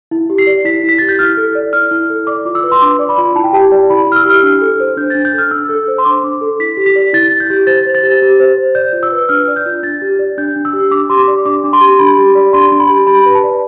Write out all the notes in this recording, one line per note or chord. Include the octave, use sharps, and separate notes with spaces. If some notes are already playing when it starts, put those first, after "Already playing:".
E4
G4
C7
D5
E4 B6
E4
B6
G4 A6
G6
E4 F6
A4
D5
E4 F6
E4
A4
D5 D6
F4
E6
B4
C6
D4 D6
D5
B5
F4
E4 A5
G5
G4 A5
D5
E4 B5
E4 F6
E6
G4 F6
D4
A4
C5
D4 G6
D4 A6
G6
A4
F6
D4 E6
A4
C5
C6
D4 D6
D4
A4
E4 B6
G4
B6
D5
E4 A6
E4
G6
G4
C5 A6
C5
A6
G4
G4
C5
C5
D5 G6
F4
E6
B4
D4 F6
D5
G6
F4
D4 A6
G4
D5
D4 G6
D4
E6
G4
D4 D6
G4 C6
D6
D5
D4 D6
D4
C6
G4
D4 B5
G4
D5
D4 C6
D4
B5
G4
G4 B5
B4
A5
D5